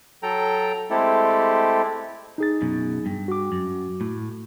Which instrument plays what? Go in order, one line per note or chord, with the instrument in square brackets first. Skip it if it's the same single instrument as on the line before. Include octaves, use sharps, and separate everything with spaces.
[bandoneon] F#3 A4 G5 A#5
G#3 A3 C4 E4 G4 A4
[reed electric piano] D#4 G#4 A6
[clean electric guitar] F#2 B2
G2
[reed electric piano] F#4 D6
[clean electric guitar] F#2
A2